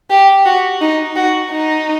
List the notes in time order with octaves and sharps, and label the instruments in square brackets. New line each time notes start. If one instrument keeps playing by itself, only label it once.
[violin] G4
F#4
D#4
F#4
D#4